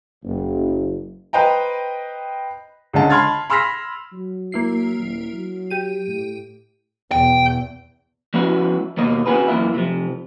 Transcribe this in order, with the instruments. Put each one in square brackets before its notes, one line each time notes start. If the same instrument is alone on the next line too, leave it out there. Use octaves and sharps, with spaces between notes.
[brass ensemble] F#1
[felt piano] B4 C5 D#5 G5 A#5
C#2 D3 G#3 C#4 D#5 A5
A5 B5 C6 F6 G#6 A6
B5 C6 E6 F6 A#6 B6
[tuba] F#3
[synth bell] A#3 E4 C7
[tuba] D#1
F#3
[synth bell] G4 D#7
[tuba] A2
[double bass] E2 B2 [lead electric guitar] G5
[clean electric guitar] F3 G#3 B3 C#4 E4 F#4
D#2 B2 A#3 D#4 D#5
C4 C#4 F4 F#4 G#4 B4
F#2 E3 A#3 F4 E5
C3 F3